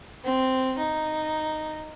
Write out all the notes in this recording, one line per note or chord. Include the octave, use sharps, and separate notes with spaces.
C4
D#4